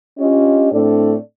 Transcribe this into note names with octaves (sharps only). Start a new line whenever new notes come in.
C#4 D4 F4 G4 D#5
A2 A3 C4 D4 A4 D5